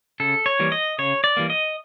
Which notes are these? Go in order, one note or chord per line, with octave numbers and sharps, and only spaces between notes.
C#3 A4
C#5
E3 G3 A#3
D#5
C#3 C#5
D5
E3 G3 A#3
D#5